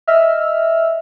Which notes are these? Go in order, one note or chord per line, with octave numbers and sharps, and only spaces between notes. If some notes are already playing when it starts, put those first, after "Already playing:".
D#5 E5 E6 F6